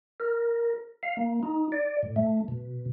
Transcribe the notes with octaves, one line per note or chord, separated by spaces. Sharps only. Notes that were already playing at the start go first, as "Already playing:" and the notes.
A#4
F5
A#3
D#4
D5
A2
A3
B2